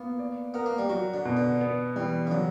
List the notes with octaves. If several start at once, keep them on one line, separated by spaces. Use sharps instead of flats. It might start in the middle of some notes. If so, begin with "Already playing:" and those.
Already playing: A#3 B3
D5
B3 A#4
A#3
G3
F#3 F#4
D3
B2
D3
B3
E3 G3
C#3
D3 F#3